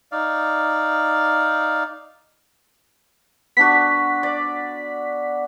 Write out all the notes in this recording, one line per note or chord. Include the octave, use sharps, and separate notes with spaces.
D#4 D5 F5
B3 D4 F#4 B6
D5